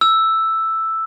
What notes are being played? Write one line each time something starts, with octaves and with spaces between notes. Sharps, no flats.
E6